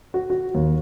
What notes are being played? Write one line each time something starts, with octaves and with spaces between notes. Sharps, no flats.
F#4
F#4
D#2